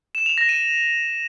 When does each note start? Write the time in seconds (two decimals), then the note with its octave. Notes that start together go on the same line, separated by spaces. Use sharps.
0.15 E7
0.26 F7
0.38 A#6
0.49 D#7